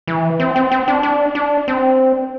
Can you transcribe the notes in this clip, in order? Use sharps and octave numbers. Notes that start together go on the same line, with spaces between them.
E3
C4
C4
C4
D4
D4
D4
C4